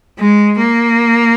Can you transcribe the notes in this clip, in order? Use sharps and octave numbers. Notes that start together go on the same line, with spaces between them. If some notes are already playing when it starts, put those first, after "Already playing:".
G#3
A#3